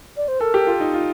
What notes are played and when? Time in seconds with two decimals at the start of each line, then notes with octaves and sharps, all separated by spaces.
0.17 D5
0.28 C5
0.40 A4 A#4
0.54 G4
0.67 F4
0.80 D#4
0.94 F4